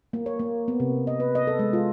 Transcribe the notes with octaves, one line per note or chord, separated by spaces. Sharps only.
A#3
C#5
A#3
B3
C3
D#5
B4
D#5
A4
G#3
F4